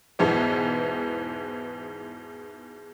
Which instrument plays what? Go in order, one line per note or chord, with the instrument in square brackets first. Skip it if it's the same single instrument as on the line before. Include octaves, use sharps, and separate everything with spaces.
[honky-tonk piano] E2 G#2 B2 E3 B3